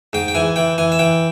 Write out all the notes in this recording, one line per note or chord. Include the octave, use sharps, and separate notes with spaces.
G#2 G5
G5
E3 G#5
E3 G5
E3 G#5
E5
E3 G5